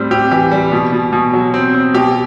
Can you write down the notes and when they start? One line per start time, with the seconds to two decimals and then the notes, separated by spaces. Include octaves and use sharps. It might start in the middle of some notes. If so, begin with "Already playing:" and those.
Already playing: A2 G3 C4
0.11 C4 G4
0.31 E3 G4
0.52 G3
0.72 B2
0.93 B2
1.13 B2
1.33 F#3
1.54 C4
1.74 C4
1.94 B2 G4